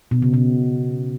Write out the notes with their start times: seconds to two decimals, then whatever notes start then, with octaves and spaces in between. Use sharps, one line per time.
0.11 B2
0.22 C#3
0.33 B2